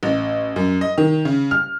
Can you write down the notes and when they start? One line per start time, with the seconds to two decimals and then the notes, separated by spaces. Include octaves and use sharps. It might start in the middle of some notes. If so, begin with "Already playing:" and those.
0.03 A1
0.56 F#2
0.81 D#5
0.98 D#3
1.25 C#3
1.51 F6